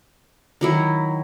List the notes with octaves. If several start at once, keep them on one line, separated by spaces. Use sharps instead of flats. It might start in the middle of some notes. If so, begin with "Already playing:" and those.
D#3 F#3 E4